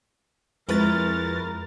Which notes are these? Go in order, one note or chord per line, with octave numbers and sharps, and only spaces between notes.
F2 G#3 E4 A#4 B4 C#5 A6